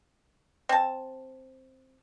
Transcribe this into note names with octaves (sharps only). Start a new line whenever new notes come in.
C4 A5